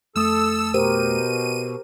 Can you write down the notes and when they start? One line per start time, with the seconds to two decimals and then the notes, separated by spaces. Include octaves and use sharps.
0.16 F2 A3 A4 D#6 E6
0.74 B2 G4 A#4 C5 D#7